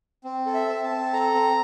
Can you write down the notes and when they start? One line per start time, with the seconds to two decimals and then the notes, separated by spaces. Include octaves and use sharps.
0.24 C4
0.46 A4
0.54 E5
0.68 C4
0.84 A5
0.90 C4
1.13 A4 A#5
1.35 C4